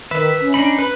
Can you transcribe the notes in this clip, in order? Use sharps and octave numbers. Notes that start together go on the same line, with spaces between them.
D#3 B4 E5
C#4
D4 D#4 B5
B4 B5